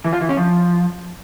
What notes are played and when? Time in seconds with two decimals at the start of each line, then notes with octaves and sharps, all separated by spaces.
0.04 E3
0.13 F4
0.21 E3
0.29 C#4
0.37 F3